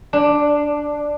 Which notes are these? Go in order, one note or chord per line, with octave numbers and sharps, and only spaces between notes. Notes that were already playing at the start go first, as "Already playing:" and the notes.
D4